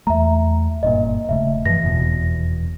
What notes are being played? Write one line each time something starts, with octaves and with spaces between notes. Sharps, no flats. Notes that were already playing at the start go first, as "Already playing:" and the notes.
E2 A3 E5 A#5
F#1 G2 A#2 D#5
D#1 C#3 A3 E5
G2 E3 F3 A#6
F1 E2 B2